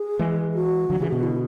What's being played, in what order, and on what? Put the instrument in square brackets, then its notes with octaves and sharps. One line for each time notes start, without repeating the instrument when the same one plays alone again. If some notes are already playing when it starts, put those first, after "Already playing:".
Already playing: [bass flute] G#4
[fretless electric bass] E3 G#3
[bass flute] F#4
[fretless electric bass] D3 F#3
[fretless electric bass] C#3 E3 [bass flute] G#4
[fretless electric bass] B2 D3 [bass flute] F#4
[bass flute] E4